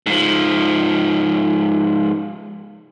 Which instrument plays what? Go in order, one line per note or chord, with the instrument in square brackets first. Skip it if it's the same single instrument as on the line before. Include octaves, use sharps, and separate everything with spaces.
[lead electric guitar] G#2 F3